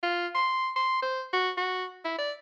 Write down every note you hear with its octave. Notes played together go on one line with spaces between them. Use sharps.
F4
C6
C6
C5
F#4
F#4
E4
D5